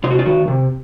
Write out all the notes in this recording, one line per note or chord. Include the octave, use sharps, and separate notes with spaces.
C3 F4
F#4
F4
D#3 F#4
C3